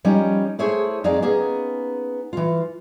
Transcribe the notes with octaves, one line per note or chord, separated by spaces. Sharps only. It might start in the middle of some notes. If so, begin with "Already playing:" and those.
F3 G3 C#4 D#4
A3 E4 G#4 C5 C#5
F2 D#4 G#4 D5 F5
A#3 B3 C#4 D#4 G#4
E3 F4